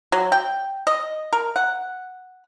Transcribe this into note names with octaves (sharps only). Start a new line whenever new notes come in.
F#3
G5
D#5
A#4
F#5